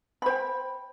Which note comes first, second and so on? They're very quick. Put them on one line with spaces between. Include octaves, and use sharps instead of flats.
B5 C5 G5